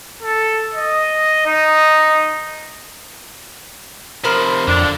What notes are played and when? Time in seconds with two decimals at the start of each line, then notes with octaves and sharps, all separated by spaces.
0.23 A4
0.75 D#5
1.46 D#4
4.24 C3 F3 A#4 C5 B5
4.68 F2 D3 D4